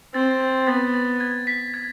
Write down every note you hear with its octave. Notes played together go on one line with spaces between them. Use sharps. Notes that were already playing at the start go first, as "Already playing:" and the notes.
C4 A6
A6
B3 A6
A6
G#6
B6
G#6